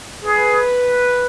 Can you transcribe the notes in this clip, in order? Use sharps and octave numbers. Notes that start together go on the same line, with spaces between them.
G#4 B4